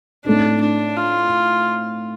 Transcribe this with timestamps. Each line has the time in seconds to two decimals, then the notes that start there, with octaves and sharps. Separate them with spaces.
0.25 A2 A3 C4 D4 D#4
0.61 D4
0.96 F4